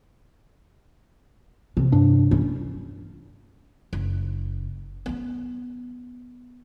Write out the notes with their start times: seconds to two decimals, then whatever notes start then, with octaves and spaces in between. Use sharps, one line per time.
1.77 C3
1.92 G2 D4
2.31 C#4
3.93 F#1
5.06 B3 C#4